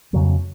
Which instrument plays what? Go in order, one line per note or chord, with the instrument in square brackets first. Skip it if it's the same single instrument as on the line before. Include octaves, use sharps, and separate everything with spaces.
[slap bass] F2 C#3 F#3 A#3